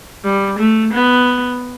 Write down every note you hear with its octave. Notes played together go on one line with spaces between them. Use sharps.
G3
A3
B3